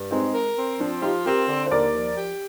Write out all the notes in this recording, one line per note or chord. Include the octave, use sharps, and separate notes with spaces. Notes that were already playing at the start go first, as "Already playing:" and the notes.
Already playing: G2
G#3 C4 D#4
A#4
C4
F3 D4
D#4 F4 G4
C4 G4 A#4
D3
C5
D#2 A#4 D5
F3
G4